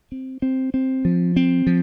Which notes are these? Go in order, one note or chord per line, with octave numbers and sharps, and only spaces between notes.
C4
C4
C4
F3
C4
F3